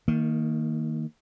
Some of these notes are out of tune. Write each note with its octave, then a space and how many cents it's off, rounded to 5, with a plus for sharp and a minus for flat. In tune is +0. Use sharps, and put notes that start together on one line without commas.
D#3 +15 A#3 -20